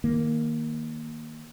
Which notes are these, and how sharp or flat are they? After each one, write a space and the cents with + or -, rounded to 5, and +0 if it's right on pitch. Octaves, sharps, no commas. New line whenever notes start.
D#3 +0 A#3 +0